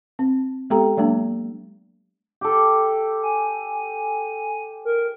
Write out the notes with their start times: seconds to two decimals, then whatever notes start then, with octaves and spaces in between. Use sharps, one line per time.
0.19 C4
0.70 G#3 B3 G4 A4 G5 A#5
0.97 F#3 G#3 A#3 D4
2.41 G4 A4
3.23 G#5
4.85 A#4